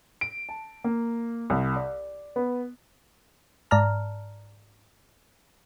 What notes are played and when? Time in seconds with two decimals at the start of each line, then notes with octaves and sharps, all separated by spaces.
0.21 D7
0.49 A5
0.84 A#3
1.50 C2
1.76 D5
2.36 B3
3.71 G#2 D5 A5 A#5 F6